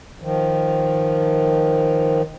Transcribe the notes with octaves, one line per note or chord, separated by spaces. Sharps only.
D#3 F3